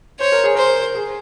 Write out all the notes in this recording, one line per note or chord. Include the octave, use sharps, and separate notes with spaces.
C5 C#5
A#4
G#4
A#4 C5
G#4